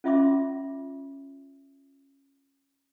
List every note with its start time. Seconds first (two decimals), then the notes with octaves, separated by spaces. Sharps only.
0.04 C#4 F4 E5 C6 D6